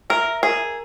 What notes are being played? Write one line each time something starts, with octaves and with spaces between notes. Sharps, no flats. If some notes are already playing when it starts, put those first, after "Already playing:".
A#4 E5
G#4 A#4